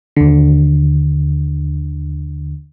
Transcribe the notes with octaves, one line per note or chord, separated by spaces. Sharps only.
D#2 D3